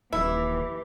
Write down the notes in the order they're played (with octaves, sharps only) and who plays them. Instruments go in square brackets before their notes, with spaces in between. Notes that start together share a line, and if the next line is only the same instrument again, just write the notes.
[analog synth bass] D#1 [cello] E3 G4 [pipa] E4